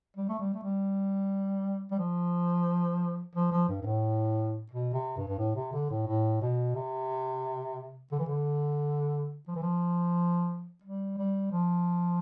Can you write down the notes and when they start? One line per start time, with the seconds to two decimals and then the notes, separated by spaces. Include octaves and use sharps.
0.17 G3
0.29 A3
0.39 G3
0.54 A3
0.62 G3
1.91 G3
1.98 F3
3.35 F3
3.52 F3
3.69 G2
3.82 G2
3.85 A2
4.71 B2
4.93 C3
5.17 G2
5.28 G2
5.39 A2
5.55 C3
5.73 D3
5.90 A2
6.07 A2
6.41 B2
6.75 C3
8.12 D3
8.19 E3
8.27 D3
9.48 F3
9.55 E3
9.62 F3
10.83 G3
11.18 G3
11.52 F3